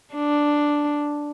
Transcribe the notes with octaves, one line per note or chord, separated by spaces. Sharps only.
D4